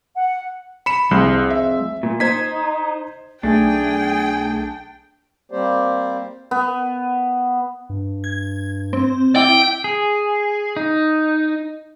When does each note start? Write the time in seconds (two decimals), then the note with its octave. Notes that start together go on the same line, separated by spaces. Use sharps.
0.15 F#5
0.86 B5 C#7 E7
1.11 C2 F2 G#3 C5
1.50 E5
2.03 A#2
2.20 D#4 C5 G#6 B6
3.43 B1 A3 D4 G#4 G5
5.52 G3 A#3 C4 G4 C5 D5
6.51 B3
7.90 G2
8.24 G#6
8.93 C4
9.36 E4 G5 D6
9.84 G#4
10.76 D#4